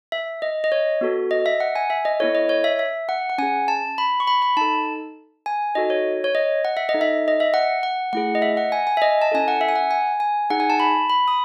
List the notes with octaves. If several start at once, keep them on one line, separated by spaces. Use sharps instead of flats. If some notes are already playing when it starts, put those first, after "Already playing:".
E5
D#5
D#5
C#5
B3 F#4 A4
D#5
E5
F#5
G#5
E5
D#5
B3 E4 A4 C#5
D#5
C#5
E5
E5
F#5
F#5
C#4 G#4 G#5
A5
B5
C#6
B5
B5
D#4 A4 A5
G#5
D#4 F#4 A4 D#5
C#5
C#5
D#5
F#5
E5
D#5
D#4 A4
E5
D#5
E5
F#5
F#5
A3 E4 G#4 F#5
D#5
E5
F#5
G#5
G#5
E5
D#5
A5
C#4 E4 A4 G#5
F#5
E5
G#5
F#5
G#5
G#5
D#4 G#4 F#5
G#5
A5
B5
B5
D#6